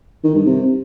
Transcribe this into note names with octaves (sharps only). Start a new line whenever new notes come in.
D#3
G2
C3